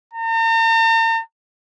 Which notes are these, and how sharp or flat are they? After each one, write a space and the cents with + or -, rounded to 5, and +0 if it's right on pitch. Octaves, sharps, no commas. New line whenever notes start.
A#5 -45